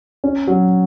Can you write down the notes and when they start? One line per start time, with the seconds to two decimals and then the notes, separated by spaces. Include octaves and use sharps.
0.24 C#4
0.47 F#3